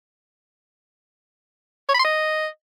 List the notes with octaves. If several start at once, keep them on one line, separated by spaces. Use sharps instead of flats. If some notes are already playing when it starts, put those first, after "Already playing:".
C#5
B5
C6
D#5